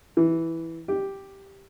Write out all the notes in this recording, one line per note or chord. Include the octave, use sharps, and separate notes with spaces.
E3
G4